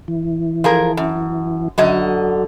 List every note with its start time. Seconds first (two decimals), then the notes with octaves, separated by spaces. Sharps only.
0.08 E3
0.64 F3 G#4 A#4
0.97 F#2
1.78 F#2 D3 F#3 D#5